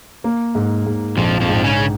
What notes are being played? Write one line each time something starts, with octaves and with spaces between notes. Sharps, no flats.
A#3
G#2
G#2
A#1 F2 F3
F2 F3
G#2
C#3 C#4